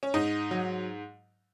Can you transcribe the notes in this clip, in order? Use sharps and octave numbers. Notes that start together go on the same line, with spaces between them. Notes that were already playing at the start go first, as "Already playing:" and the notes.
C#4
G#2 D#4
F#3